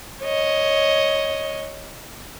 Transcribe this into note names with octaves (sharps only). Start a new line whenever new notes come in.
C#5 D#5